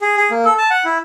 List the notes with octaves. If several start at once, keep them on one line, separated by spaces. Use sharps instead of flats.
G#4
G#4
A#3
A4
A5
F#5
E4